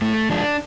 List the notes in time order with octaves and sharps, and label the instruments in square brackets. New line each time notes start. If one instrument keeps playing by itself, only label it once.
[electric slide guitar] A2 A3
F3 G#3 D4